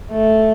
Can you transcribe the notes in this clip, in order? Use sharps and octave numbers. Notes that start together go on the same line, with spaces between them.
A3